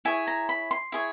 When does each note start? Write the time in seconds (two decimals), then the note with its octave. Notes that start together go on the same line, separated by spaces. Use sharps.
0.05 E4 G#4 C#5 G#5
0.27 A#5
0.49 B5
0.71 C6
0.92 E4 G#4 C#5